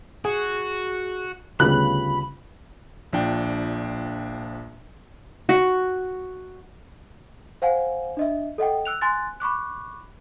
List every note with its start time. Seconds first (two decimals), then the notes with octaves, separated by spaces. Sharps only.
0.25 F#4 G#4
1.60 D2 C#3 G3 B3 F4 B5 F#6
3.13 A#1 F3 D4 G5
5.49 F#4
7.62 C5 F5 F#5 G#5
8.17 D4 D#5 E5
8.58 A4 D#5 F#5 G5
8.85 E6 F#6 F7
9.01 G#5 C6 F#6 A6
9.40 B5 C#6 D6 F#6